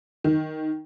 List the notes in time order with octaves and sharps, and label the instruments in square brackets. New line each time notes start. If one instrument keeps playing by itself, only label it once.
[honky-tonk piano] D#3